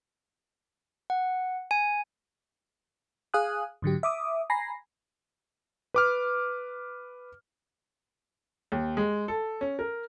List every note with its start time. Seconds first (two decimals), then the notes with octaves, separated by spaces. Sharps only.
1.10 F#5
1.71 G#5
3.34 G#4 F5 G#5 D#6 F#6
3.82 G#2 D3 F#3 G4
4.03 E5 D6 D#6
4.50 G#5 A#5 B5 A#6 C7
5.94 B4 D6 F6
8.72 D#2
8.97 G#3
9.28 A4
9.61 C#4
9.79 A#4